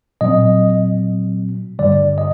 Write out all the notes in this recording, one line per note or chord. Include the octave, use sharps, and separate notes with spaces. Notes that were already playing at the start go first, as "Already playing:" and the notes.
A#2 F#3 C4 D#5
G2 D3 G3 D5
D#5